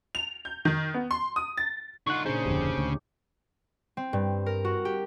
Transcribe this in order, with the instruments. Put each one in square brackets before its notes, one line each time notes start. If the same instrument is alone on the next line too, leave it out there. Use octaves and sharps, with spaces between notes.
[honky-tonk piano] F7
G6
D#3
B3
C6
D#6
A6
[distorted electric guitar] D3 F4 [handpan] D#4 [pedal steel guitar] F#5 C#6
[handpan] A#2 D4 G#4 [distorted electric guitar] C#3 C#4 [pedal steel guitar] C5
[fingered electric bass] D1 F2 D3 [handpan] G4
[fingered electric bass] D2
[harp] C4
G2
A#4
F#4
G4